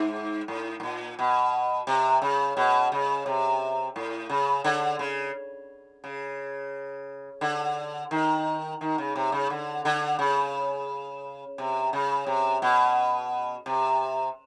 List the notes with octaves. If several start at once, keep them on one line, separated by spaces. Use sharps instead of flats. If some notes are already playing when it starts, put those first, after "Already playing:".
Already playing: G#2
A2
A2
A#2
B2
C3
C#3
B2
C#3
C3
A2
C#3
D3
C#3
C#3
D3
D#3
D#3
C#3
C3
C#3
D3
D3
C#3
C3
C#3
C3
B2
C3